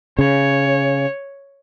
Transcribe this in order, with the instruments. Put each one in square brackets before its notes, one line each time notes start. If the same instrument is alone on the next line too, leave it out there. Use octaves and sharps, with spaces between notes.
[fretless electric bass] C#3 [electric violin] C#5